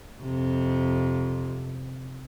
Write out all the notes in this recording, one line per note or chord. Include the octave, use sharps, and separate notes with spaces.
F2 C3